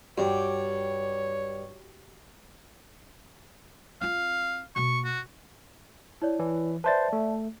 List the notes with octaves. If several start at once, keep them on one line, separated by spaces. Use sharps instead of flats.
G2 F#4 G4 C#5
C4 F4 F5
B2 A#3 C#6
F#4
E4 C#5 D5
E3
B4 C5 D5 E5 A5 A6
A3